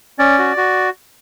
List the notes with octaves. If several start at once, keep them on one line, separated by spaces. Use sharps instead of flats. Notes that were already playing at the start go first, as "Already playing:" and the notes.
C#4 D5
F#4
F#4